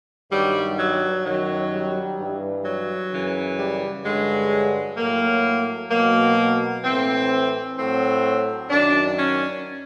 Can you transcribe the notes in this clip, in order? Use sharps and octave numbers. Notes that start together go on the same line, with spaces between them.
G2 D#3 F#3 G3
F#3
F#2 D#3 F#3
G3
G2 E3
F#3
F#2 C#3 E3
G3
G2 D3 F#3 G#3
A2 F#3 A#3
B2 F#3 A#3
A2 E3 C4
A2 F#3 C4
F#2 D#3 F#3 D4
C#4